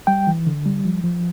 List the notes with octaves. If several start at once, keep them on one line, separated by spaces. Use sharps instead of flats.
G3 G5
E3
D3
G3
F3
F3